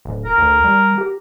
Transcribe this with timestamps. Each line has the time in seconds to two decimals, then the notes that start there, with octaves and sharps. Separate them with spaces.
0.05 D1
0.25 A#4
0.38 D2
0.64 G3
0.98 G4